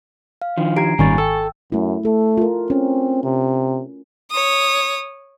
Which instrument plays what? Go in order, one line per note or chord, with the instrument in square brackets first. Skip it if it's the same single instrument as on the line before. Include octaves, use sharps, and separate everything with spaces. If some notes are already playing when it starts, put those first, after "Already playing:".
[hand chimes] F5
[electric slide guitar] D#3 F3 [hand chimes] D4
[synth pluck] G4 G#6 [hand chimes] A#5 C7 D7
[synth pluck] G#1 D#3 [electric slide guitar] A#2 G3 C#4 [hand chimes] G#5 C#6 A6
[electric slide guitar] A4 [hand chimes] G5 E6
[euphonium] F#2 [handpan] A3 E4
[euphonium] A3 [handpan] A4
[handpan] F4 A#4
[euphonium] C4 [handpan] C#4
[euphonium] C3
[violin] C#5 D#6